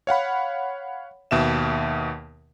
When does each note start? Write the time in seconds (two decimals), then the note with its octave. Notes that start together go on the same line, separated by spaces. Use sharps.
0.07 C#5 F5 F#5 B5
1.31 D#2 B2 E5 E7